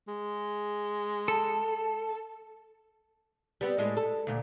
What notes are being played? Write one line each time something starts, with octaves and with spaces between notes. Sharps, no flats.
G#3
A4 A5
G3 B3 C4
A2 G#3 D#5
A4
D2 A#2